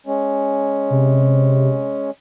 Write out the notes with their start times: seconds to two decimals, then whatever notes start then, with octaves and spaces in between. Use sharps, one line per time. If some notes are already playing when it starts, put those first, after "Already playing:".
0.07 G#3 C#4
0.90 C3